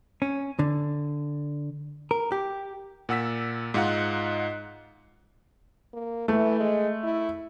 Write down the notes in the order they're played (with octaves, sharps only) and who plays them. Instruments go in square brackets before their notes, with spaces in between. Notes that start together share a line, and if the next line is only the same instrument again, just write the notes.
[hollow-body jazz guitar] C#4
D3
A#4
G4
[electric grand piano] A#2 F#5 E6 B6
G#2 D#4 F4 F5 F#5 F#6
[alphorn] A#3
[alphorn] E3 [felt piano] A3
[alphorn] G#3
E4